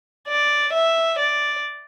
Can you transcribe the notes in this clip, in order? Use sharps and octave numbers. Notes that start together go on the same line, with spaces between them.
D5
E5
D5